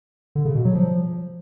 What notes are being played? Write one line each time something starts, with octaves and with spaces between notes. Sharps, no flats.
D3
C#3
B2
F#3
F3